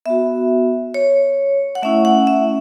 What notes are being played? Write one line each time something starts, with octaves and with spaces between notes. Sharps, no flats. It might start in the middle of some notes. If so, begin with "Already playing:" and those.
B3 F#4 E5
C#5
F#5
A3 C#4 E4 E5
F#5
E5